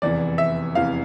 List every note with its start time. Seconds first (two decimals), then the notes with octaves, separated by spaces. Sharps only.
0.02 F1 E2 E3 D5
0.38 E5
0.75 F1 E2 E3 F5